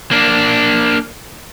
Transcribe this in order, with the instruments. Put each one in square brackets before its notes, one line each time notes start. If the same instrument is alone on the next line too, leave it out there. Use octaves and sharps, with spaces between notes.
[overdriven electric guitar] A#3 D4